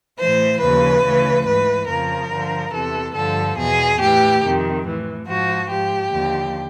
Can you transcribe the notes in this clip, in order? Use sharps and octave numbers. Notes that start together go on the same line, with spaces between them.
A2 E3 C5
D#2 C#3 F3 B4
D2 C#3 E3
G#2 E3 B4
F2 C#3 F3 A#4
G2 D3 F3
E2 C3 E3 A4
G2 D3 F3 A4
E2 B2 G#4
A2 E3 G4
F2 C3 D#3
A2 E3
G#2 F3 F#4
G#2 F3 G4
D#2 D3 F3